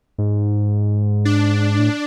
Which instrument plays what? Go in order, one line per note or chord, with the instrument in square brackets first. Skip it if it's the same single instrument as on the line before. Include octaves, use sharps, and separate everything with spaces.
[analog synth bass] G#2
[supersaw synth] D4
[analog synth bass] A2